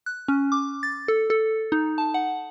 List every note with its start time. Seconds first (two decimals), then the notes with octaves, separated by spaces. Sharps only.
0.06 F#6
0.28 C#4
0.52 D6
0.83 A6
1.08 A4
1.30 A4
1.72 D#4
1.98 A5
2.14 F#5